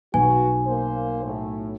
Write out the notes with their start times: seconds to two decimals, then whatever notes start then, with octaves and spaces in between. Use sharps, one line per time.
0.14 B1 F#4 B4 G#5
0.66 A#3 C5
1.24 A2